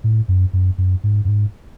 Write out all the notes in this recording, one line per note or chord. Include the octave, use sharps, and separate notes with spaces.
A2
F#2
F#2
F#2
G#2
F#2
G#2